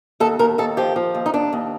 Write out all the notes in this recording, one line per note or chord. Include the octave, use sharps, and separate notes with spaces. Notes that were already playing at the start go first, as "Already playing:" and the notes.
D#2 A4
D#2 A#4
D#2 A4
F3 G4
F3
D#2
D#4
D#2 D4
D#2